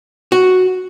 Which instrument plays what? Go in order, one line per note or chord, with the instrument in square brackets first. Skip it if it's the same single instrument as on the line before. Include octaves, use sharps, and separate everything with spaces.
[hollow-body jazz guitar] F#4